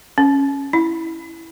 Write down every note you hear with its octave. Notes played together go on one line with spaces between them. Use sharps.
C#4
E4